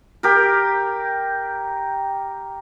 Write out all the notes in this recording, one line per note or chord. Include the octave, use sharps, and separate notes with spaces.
G4 A#4